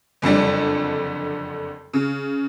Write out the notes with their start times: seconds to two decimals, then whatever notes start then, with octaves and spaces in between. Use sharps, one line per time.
0.22 F#1 F2 D3 G3
1.93 C#3